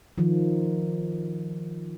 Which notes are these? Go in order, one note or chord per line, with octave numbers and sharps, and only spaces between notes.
D#3 F3